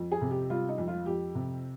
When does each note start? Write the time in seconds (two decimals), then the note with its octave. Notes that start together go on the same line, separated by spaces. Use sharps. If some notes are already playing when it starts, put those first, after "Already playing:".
Already playing: F2
0.12 G#4
0.21 C3
0.31 G4
0.50 G3 F4
0.69 D#4
0.78 F2
0.88 F4
1.06 F2 G4
1.35 C3